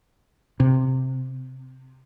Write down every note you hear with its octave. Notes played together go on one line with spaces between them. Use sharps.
C3